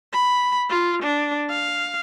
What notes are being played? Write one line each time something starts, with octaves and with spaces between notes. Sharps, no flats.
B5
F4
D4
F5